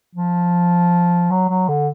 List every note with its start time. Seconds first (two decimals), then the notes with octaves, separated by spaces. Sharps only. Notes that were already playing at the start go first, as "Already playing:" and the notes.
0.15 F3
1.31 F#3
1.49 F#3
1.68 D3